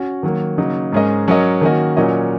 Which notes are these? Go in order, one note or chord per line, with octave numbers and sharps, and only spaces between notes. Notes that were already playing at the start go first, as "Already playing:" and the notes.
Already playing: C#4 F#4
D#3 F#3 A#3
C#3 F#3 A#3 D#4
G#2 G#3 C#4 A#4 D#5
F#3 C#4 A#4 D#5
D#3 A#3 C#4 F#4 D#5
A#2 F#3 C#4 A#4 D#5